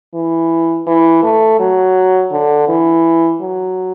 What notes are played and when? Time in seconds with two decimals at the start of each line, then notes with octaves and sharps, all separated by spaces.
0.14 E3
0.87 E3
1.23 A3
1.60 F#3
2.32 D3
2.68 E3
3.41 F#3